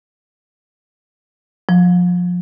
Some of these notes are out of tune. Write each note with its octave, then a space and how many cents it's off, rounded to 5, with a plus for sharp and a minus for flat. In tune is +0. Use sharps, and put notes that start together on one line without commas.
F3 +30